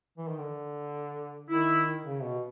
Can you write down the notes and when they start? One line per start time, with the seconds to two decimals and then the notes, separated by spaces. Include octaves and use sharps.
0.18 E3
0.28 D#3
0.39 D3
1.49 D#3 E4
2.05 C#3
2.24 B2